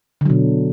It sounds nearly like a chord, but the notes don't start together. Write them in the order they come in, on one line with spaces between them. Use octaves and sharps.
D3 F#3 B2